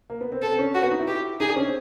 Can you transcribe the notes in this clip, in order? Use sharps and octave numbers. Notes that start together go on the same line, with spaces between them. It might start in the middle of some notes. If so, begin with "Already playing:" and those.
A#3
B3
C4
C4 A4
C4
C#4
C4 F#4
B3
D#4
E4
G4
D#4 G#4
D4
C#4
C4